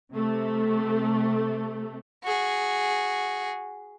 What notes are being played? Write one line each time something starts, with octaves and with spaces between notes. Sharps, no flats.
C3 A3
F#4 G#4